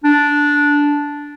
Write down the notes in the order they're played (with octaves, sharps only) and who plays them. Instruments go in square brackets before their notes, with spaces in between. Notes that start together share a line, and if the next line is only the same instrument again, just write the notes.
[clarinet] D4